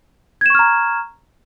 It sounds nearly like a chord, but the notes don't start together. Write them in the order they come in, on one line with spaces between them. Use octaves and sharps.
G#6 E7 C#6 F6 A#5